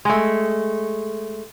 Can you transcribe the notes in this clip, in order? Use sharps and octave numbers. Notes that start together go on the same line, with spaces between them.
G#3 A3